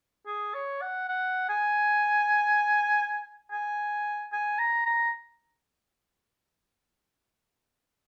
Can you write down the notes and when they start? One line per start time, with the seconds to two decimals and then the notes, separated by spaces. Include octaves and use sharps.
0.26 G#4
0.54 C#5
0.81 F#5
1.08 F#5
1.49 G#5
3.51 G#5
4.32 G#5
4.58 A#5
4.86 A#5